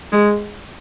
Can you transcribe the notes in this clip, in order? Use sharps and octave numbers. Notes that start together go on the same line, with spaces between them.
G#3